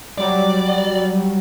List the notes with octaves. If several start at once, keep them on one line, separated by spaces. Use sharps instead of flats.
F#3 G3 D5